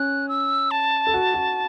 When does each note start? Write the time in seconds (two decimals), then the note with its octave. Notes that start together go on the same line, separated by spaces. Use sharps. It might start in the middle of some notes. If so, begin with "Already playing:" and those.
Already playing: C#4 F#6
0.29 E6
0.71 A5
1.07 A4
1.14 F#4
1.34 F#4